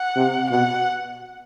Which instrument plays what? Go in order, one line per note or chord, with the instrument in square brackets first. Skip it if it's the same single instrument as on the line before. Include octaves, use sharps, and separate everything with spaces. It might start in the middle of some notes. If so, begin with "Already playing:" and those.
Already playing: [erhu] F#5
[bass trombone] C3
[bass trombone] B2 [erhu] F#5